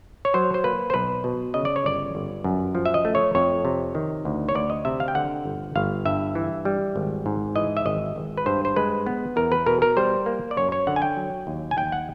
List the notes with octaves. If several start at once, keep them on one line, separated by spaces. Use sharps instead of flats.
C#5
F#3 C5
C5
A#3 B4
C5
B1 B4
B2
C#3 D#5
D5
C#5
G1 D5
G1
F#2
F3
E5
D#5
A3
C#5
F2 C#5
C3
D#3
D2
C#5
D2 D5
D#5
C3 E5
F5
G5
D3 F#5
G1
G1 F5
G2 E5
E3
G3
G#1
G#2
E3 D#5
E5
G#1 D#5
G#1
B4
G2 C5
C5
G#3 B4
B3
E2 A#4
B4
B2 A#4
A#4
G3 C5
A#3
D5
F#2 C#5
C#5
D3 F#5
G#5
G5
F#3
D#2
G#5
D#2 G5
F#5